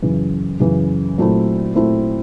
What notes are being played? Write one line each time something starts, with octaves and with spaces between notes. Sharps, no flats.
F#2 C#3 E3
F#2 C#3 E3
A#2 F#3 A3 C4 E4
A#2 F#3 A3 C4 E4